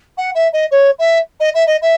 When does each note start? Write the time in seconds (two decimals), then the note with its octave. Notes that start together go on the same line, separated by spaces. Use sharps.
0.17 F#5
0.35 E5
0.53 D#5
0.71 C#5
0.99 E5
1.40 D#5
1.54 E5
1.67 D#5
1.82 E5